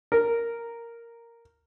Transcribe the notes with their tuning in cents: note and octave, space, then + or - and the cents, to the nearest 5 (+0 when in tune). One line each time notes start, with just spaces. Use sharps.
A#4 -5